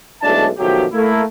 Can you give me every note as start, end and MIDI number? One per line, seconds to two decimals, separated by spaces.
0.22 0.47 35
0.22 0.47 45
0.22 0.47 56
0.22 0.47 62
0.22 0.47 76
0.22 0.47 81
0.58 0.85 47
0.58 0.85 51
0.58 0.85 53
0.58 0.85 54
0.58 0.85 57
0.58 0.85 67
0.93 1.22 57
0.93 1.22 58
0.93 1.22 64